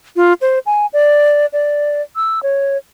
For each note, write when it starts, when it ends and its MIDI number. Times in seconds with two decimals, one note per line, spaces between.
0.16 0.33 65
0.42 0.59 72
0.66 0.86 80
0.93 1.46 74
1.53 2.02 74
2.16 2.42 88
2.43 2.77 73